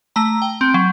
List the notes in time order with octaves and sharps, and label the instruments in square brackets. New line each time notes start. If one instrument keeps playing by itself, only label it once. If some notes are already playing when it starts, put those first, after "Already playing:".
[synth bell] A3 A#5
G5
C4 D7
F#3